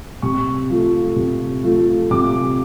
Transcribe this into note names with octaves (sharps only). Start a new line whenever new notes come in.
C3 C#6
F3 A3
C3
F3 A3
C3 D6